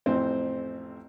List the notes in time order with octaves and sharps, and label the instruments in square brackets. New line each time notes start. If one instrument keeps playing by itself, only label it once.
[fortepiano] A1 F2 C4 C5